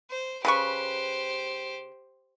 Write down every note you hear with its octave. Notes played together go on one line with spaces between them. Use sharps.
C5
C#3 G4 B4 C5 C#6